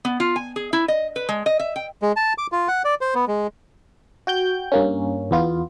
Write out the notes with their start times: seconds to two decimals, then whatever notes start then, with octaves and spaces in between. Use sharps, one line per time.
0.05 B3
0.20 F4
0.36 G#5
0.56 G#4
0.73 E4
0.88 D#5
1.16 B4
1.29 G#3
1.46 D#5
1.59 E5
1.76 G5
2.02 G#3
2.16 A5
2.38 D6
2.52 F4
2.68 F#5
2.85 D5
3.01 C5
3.15 B3
3.28 G#3
4.27 F#4 G5 G6
4.72 G2 A#3 C#4
5.31 E2 B3 F4